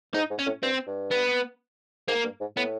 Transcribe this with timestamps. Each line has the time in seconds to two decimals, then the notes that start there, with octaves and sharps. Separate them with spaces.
0.14 G#2 D#4
0.30 G#2
0.39 C#4
0.46 A2
0.62 G2 C4
0.87 G2
1.12 B3
2.08 G#2 A#3
2.24 G2
2.40 G#2
2.56 A2 B3